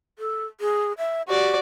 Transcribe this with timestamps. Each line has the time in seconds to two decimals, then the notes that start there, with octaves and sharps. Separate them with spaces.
0.19 A4
0.61 G#4
0.98 E5
1.28 F#4 G4 D5